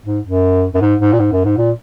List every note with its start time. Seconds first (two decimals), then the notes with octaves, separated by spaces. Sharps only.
0.06 G#2
0.25 F#2
0.74 F#2
0.81 G#2
1.00 G#2
1.12 A#2
1.19 G#2
1.32 F#2
1.45 G#2
1.57 A#2